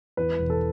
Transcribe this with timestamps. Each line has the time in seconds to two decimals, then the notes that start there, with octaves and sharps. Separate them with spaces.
0.17 E2 B4
0.39 E1
0.50 A4